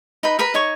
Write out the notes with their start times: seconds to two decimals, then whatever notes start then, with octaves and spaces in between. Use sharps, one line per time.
0.23 D#4 B4 B5
0.39 A#4 B4 B5
0.54 D#4 C#5 C#6